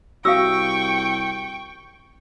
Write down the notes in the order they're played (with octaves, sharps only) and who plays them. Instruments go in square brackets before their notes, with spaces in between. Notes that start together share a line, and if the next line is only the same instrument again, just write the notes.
[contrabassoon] C2 [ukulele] F#4 E5 [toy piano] F5 D#6 E6 [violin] G5 C#6